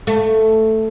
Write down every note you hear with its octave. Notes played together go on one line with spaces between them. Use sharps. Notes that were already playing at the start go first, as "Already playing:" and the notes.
A3